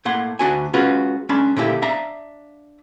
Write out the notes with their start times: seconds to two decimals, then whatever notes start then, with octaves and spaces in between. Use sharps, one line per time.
0.05 A2 A#3 F#5 C6
0.39 D2 D4 F#4 G#5
0.74 G#3 C#4 F4 F#4 B4
1.29 G#3 C#4 D4 B5
1.56 A#2 D3 A#3 E4 G4
1.82 D4 E5 F5 A#5